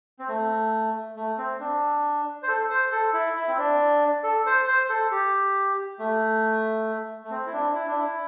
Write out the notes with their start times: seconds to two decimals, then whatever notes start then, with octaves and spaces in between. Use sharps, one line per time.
0.19 C4
0.28 A3
1.16 A3
1.38 C4
1.60 D4
2.43 C5
2.48 A4
2.70 C5
2.92 A4
3.13 E4
3.36 E4
3.48 C4
3.58 D4
4.24 A4
4.46 C5
4.68 C5
4.89 A4
5.11 G4
5.99 A3
7.24 A3
7.30 C4
7.46 E4
7.53 D4
7.75 E4
7.87 D4
7.99 E4